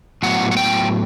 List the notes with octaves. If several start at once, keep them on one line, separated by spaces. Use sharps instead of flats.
A2 F#3 B3 F#5
F#5
G5